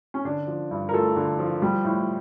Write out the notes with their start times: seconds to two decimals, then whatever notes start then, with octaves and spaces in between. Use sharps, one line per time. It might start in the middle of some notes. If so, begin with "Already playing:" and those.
0.14 C#4
0.25 D3 D4
0.47 F3
0.71 G2
0.89 A#4
0.93 A3 F4 A4
1.16 D3
1.39 F3
1.62 G3
1.85 A2